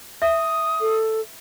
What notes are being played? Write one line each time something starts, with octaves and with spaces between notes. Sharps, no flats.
E5 D#6
A4